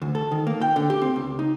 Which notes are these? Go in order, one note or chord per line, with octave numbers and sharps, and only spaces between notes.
D2
A4
D#3
A#3
G5
D3
G4
C4
C#2
D#4